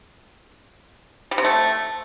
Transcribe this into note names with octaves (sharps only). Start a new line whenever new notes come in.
G3
C3
A3